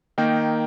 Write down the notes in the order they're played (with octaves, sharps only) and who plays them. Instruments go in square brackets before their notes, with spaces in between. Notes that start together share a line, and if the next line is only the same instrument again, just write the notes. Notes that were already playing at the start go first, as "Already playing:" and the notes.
[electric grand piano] D#3 A#3 D#4 G5